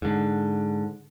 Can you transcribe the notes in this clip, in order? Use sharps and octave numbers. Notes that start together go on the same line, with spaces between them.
G#2 D3